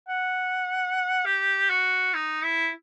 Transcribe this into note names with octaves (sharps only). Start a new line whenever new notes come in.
F#5
G4
F#4
D#4
E4